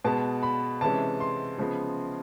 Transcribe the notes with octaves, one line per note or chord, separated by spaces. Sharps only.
B2 G#3 B3 A5
B5
C3 E3 G#3 C#4 A5
C6
C#3 F3 G#3 B3